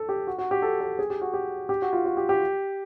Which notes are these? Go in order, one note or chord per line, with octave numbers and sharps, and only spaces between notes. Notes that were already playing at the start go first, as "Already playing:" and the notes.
Already playing: A4
G4
F#4
F#4
G4
A4
A4
G#4
G4
F#4
G4
G4
F#4
F4
F#4
G4
G4